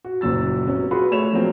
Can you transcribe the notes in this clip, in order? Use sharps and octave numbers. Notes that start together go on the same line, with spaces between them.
F#4
F#1 A#2 F#3 E6 A6
C3 F#3 B3 C#4
F4 F#4 G#4 B4 B5 C6
A3 C#5 E7 F7
F3 F#3 G#3 A#3 C4